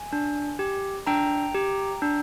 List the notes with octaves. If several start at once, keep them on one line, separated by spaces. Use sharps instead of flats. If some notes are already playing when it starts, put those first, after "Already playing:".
Already playing: G#5
D4
G4
D4 G5 A#5
G4
D4